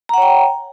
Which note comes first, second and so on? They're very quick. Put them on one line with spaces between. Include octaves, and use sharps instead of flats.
A#5 F#5 C#5 G5